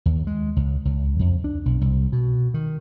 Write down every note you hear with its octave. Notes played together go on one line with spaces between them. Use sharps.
D#2
G#3
C#2
C#2
F2
D4
B1
C2
B2
D#3